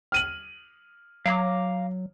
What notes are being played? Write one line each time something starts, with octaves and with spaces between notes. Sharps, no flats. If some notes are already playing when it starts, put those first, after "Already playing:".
F6 D#7 F#7
F#3 F5 A#5 D6